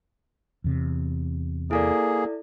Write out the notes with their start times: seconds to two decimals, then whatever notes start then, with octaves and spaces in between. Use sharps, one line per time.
0.64 E2 C3
1.71 A#3 E4 G#4 A4 D5